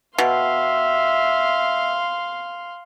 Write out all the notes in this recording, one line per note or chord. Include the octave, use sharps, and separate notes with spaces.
B2 E5 F5 C6